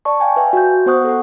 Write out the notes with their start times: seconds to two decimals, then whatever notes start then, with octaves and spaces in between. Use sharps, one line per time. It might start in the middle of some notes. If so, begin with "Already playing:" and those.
0.05 D5 A5 C#6
0.20 F5 G5 G#5
0.36 B4 E5 G#5
0.53 F#4 G6
0.86 B3 C5 F#5 C#6 D#6 F#6
1.05 A4 F#5